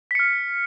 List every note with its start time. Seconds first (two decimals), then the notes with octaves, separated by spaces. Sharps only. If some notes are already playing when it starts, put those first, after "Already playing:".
0.11 B6
0.15 C#7
0.19 F6